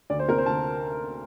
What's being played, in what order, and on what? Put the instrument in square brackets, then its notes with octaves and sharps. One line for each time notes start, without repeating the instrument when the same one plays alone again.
[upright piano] D2 D5
C5
C3 A#4
C5
D2 A5